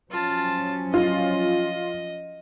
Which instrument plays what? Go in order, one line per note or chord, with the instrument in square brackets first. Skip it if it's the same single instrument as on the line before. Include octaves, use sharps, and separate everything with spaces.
[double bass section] F3 F#3 C#4 [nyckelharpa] F4 A5
[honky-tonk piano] F4 [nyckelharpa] D#5